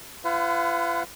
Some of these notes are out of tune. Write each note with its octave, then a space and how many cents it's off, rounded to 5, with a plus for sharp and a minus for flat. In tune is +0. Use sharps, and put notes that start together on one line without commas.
F4 -40 B4 +40 F#5 -15